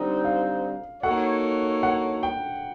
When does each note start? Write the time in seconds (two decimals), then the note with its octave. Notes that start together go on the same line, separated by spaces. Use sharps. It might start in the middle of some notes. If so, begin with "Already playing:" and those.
Already playing: D3 G3 C4 D#4
0.25 F5
1.03 A#3 D#4 F#4 A4 C#5 F#5
1.83 F#5
2.23 G5